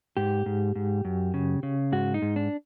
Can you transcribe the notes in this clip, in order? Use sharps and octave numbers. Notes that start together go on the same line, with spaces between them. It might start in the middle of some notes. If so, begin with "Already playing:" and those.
G#2 G4
G#2
G#2
F#2
C#3
C#3
G#2 F#4
D#4
G#2
D4